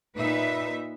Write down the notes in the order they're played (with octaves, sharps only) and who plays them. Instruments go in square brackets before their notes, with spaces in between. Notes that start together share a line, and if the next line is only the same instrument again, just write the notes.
[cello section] A#2 D#4 B4 E5